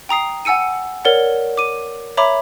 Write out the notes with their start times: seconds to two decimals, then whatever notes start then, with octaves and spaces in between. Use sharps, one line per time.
0.09 G5 A#5 D#6 C7
0.45 F#5 G#5 E6 C#7 D#7
1.05 A#4 C#5 D5 F#5
1.58 D6 D#7
2.17 C#5 E5 A#5 B5 D6